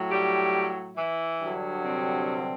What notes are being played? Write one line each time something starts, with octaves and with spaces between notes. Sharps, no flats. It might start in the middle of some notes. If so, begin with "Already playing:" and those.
Already playing: A2 F#3
G3 G4
E3 E4
G2 D3 F#3
C3 C4